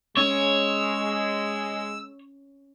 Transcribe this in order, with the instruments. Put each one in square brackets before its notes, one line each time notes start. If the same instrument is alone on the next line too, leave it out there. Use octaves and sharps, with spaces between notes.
[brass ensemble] G#3 [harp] C#4 [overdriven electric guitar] C#5 [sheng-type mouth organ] E6